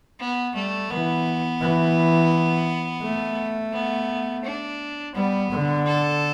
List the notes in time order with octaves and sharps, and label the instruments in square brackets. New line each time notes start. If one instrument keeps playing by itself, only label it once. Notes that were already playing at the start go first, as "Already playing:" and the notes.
[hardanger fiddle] B3
[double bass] G3 [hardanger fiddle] A3
[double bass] E3 [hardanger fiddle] B3
[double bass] E3
A3
[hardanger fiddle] B3
D4
[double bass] G3 [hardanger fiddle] B3
[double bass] D3
[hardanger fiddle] A4